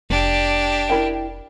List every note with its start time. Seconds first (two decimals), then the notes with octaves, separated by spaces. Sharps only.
0.10 F1 D4 G4
0.89 E4 A#4 G5